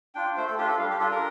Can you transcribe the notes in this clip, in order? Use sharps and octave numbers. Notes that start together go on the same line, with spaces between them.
D4 F4 G5
A3 C5
A4
D4 F4 G4
A4
G3 F5
G4
D4 F4 A4
A#4